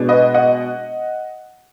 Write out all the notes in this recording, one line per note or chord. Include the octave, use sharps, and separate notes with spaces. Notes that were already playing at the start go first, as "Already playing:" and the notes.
Already playing: B2 G#3 B3 D4
B4 D#5
D#5 F#5